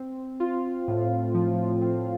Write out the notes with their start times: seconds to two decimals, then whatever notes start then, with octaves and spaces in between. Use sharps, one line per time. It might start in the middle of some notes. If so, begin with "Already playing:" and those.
Already playing: C4
0.40 F4
0.88 A2
1.34 F3
1.81 C4